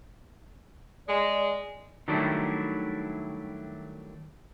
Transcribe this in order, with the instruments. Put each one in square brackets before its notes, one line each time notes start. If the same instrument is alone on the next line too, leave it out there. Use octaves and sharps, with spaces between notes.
[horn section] G#3 [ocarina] D5
[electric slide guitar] D#3 F#3 G3 A3 D4 E4